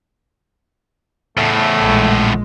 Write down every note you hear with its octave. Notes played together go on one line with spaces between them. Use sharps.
E2 A2 A3
A#1 G#3